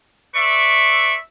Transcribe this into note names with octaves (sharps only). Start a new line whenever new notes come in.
B4 D5 E5 C#6